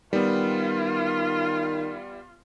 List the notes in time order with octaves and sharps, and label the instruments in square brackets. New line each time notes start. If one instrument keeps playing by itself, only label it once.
[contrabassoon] D#3 [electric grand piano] G3 B3 [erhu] F4